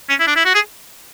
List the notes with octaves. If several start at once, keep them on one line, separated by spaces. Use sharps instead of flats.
C#4
E4
D4
E4
F#4
G#4